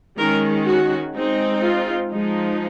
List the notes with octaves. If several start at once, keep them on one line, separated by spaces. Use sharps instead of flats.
D#3 G#3 C#4 A#4
F#4
G#3 C4 D#4
F4
F3 G#3 D#4